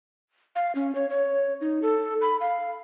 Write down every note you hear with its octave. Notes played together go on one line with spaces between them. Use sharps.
F5
C#4
C#5
C#5
D#4
A4
B5
F5